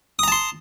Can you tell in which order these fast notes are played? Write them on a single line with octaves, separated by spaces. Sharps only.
D#6 A#5 A5 C6